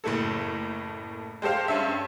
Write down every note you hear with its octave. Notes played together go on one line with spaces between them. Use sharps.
F#1 A2 A3 A#3 A4
G#3 G4 A4 C5 F5
G2 C#4 E5